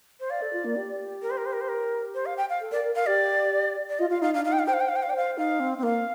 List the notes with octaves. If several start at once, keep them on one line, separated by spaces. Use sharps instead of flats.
C5
D5 F5
A4
F4
A#3
G4
A#4
C5
A#4
C5
A#4
C5
A#4
C5
F5
G5
F5
A4
A#4 D5
A#4
A#4 F5
G4 D5
D5
F4 D#5
F4 F5
D#4 F5
D4 F5
D#4 F5
G5
F5
C5 G5
F5
G5
F5
C5 G5
F5
D5 G5
C5 F5
D#4 F5
C4
C4
A#3 F5